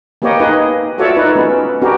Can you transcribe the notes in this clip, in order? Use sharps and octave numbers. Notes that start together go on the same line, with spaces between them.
A#3 B3 G4 C#5 D#5
D#4 G#4 B4 D#5
F4 F#4 A4 C#5 D5 E5
D#4 A#4 B4
G#3 B3 C#4
B3 D4 F#4 G4 A#4